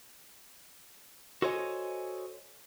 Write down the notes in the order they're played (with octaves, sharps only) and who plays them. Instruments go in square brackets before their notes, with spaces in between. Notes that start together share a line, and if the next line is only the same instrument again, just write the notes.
[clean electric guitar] F#4 A4 C5 C#5 D#5 G#5